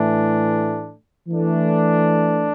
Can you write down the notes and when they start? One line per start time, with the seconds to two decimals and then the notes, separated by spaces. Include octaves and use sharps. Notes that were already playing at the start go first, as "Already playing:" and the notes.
Already playing: A2 E3 A3 D4
1.27 E3 A3 D4